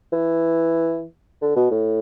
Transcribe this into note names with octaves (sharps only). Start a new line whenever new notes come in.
E3
D3
B2
A2